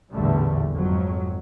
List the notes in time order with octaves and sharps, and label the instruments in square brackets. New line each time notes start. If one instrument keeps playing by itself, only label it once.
[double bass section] A1 E2 A#2 D3 G3 A3
G#1 F2 F#3